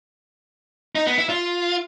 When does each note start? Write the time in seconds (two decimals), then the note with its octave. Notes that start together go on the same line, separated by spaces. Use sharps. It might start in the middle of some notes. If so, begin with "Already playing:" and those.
0.95 D#4
1.07 B3
1.18 E4
1.29 F4